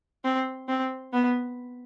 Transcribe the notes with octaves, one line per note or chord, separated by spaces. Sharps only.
C4
C4
B3